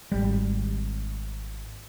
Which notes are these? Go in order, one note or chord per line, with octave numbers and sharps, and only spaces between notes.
G#1 G3